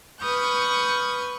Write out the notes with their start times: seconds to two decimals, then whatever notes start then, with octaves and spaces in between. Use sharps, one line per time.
0.21 B4 C#6 D#6 F6 G6